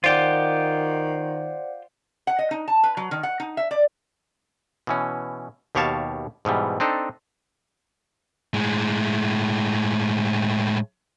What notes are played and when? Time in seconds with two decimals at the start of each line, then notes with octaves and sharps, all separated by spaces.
0.04 D#3 F4 G4 C5 D5 F#5
2.27 F#5
2.39 D#5
2.51 D#4
2.68 A5
2.83 B4
2.97 F#3
3.11 D#3
3.23 F#5
3.40 D#4
3.57 E5
3.71 D5
4.87 B2 E3 C#4
5.75 D#2 B2 G4 C#5 F5 A5
6.45 G#2 B2 E3 G3
6.80 C4 D4 D#4 A4
8.54 A2 G#3